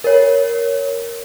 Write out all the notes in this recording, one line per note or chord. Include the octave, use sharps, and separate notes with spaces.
A#4 C#5